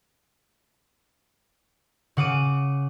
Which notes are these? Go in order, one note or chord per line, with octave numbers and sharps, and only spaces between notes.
C#3 F#5 D6 D#7